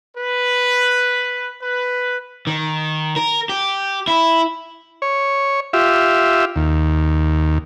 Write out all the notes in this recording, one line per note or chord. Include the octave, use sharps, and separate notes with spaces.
B4
B4
D#3
A#4
G4
E4
C#5
F4 G4 E5
D#2